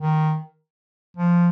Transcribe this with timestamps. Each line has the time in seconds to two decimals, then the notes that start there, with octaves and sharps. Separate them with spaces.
0.01 D#3
1.17 F3